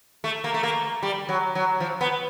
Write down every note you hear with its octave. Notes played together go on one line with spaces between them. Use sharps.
A3
A#3
A3
A#3
G3
F#3
F#3
F3
B3